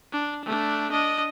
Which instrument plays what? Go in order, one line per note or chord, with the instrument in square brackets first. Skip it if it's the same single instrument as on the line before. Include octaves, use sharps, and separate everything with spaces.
[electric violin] D4
A3 D4
D4 D#5